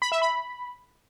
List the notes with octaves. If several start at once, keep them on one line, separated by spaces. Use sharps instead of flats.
B5
E5
B5